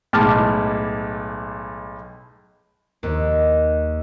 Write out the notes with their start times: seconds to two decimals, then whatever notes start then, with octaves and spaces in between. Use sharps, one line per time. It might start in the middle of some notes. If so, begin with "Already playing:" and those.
0.13 B1 A2 G#3 A5 D6 F6
3.03 D#2